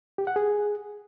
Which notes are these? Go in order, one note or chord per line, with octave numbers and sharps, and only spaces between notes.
G4
F#5
G#4